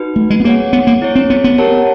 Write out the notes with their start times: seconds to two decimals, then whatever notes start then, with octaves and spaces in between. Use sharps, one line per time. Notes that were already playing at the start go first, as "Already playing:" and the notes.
Already playing: D#4 F#4 B4
0.16 A3
0.30 G#3
0.40 B3
0.44 A#3 G#4 C#5 F#5
0.73 B3
0.87 A#3
1.02 E4 G#4 C#5
1.15 C4
1.30 B3
1.44 B3
1.58 G4 A#4 C#5 F#5 A5